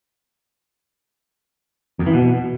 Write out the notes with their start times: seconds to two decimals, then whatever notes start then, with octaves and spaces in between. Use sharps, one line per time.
1.99 F2
2.06 E3
2.13 B2